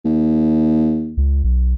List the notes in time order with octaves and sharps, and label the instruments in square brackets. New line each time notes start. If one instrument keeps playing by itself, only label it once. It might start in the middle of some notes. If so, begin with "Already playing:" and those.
[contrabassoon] D#2
[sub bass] C#2
B1